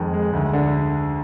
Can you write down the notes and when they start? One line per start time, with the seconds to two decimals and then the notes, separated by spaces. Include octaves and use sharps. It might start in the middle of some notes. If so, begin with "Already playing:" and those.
Already playing: F2 D#3 G#3
0.13 G#3
0.33 D2
0.53 D3